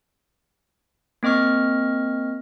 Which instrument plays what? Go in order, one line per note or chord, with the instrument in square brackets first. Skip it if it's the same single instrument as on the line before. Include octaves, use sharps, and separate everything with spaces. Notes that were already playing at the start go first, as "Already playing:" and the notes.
[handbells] A#3 C4 D#5 C#6 F6